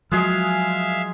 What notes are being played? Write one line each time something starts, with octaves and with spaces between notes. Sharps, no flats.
F3 F#3 G#3 G#4 E5 F5